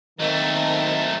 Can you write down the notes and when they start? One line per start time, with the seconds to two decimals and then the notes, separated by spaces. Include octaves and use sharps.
0.19 D#3 F#3 A3 A#3 C4 D#5